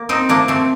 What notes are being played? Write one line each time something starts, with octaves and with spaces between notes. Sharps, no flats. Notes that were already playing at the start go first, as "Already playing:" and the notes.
Already playing: A#3
C4 D#4
F3 A3 A#3 D4
A3 C4